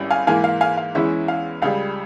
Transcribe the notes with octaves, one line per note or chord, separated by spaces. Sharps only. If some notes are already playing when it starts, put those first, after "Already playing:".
Already playing: G#1 G3 C#4 E4
F5 G#5
G#2 E3 A#3 F5 G#5
F5
F5 G#5
F5
E2 E3 G#3 C#4 E4 E5
F5
C#2 C#3 G3 F5